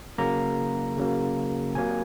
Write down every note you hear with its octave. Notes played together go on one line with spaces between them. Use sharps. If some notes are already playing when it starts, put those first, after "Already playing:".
C#3 F#3 A#3 A#5
C#3 F#3 A#3
C3 F#3 A#3 G#5